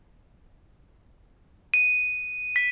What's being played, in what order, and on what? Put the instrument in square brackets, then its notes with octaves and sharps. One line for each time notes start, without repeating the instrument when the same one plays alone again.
[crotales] D#7
B6